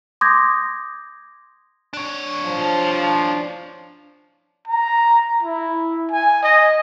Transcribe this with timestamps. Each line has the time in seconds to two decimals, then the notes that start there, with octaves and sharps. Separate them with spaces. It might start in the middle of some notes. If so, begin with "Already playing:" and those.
0.21 C6 D6 D#6 G6 G#6 A#6
1.93 D4 C#5
2.45 F3
4.68 A#5
5.43 E4
6.11 G#5
6.42 D#5